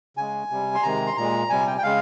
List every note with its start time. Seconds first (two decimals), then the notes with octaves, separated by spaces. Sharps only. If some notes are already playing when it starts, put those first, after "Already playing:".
0.17 C#3 G#3 G#5
0.50 C3 G3
0.75 C6
0.83 C3 D#3 G#3 A#5
1.06 C6
1.17 A#2 G#3 A#5
1.49 C3 G3 G#5
1.67 G5
1.78 G5
1.83 C#3 G#3 F5